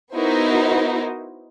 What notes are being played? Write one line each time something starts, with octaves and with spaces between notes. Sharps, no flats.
B3 D#4 E4 F#4 A#4 C5